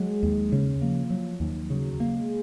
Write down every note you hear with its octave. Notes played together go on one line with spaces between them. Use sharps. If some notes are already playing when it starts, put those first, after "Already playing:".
Already playing: F#3 G#3
D#2
C#3
F3 A#3
F#3
D#2
C#3 F#3
A#3
G#3